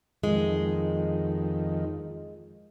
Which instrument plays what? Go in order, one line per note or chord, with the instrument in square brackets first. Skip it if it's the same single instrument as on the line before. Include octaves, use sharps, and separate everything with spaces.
[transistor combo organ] F2 D#3 [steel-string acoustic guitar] G#3